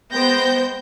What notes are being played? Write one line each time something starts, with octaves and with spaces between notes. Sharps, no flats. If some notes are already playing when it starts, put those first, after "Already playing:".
G#3 B3 C5 G5 G6 A#6